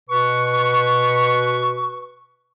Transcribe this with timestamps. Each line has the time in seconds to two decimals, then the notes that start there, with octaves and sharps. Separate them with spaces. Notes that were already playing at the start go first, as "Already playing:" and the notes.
0.10 B2 B4 C#6